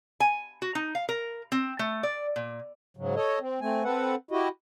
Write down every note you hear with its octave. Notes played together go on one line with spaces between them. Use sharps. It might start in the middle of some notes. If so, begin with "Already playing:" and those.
G#5
F#4
D#4
F5
A#4
C4
A3
D5
A#2
G#2 C#3 F#3
A4 C#5 D#5
C4
A3 C4 G#5
C4 A4 B4 F#5
E4 F#4 G4 D#5